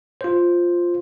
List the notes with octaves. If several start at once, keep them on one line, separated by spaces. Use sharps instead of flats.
F4 C5